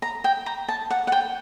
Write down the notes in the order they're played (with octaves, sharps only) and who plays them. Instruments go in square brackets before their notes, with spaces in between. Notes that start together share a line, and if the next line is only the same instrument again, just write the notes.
[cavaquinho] A#5
G5
A#5
A5
F#5
F#5
G5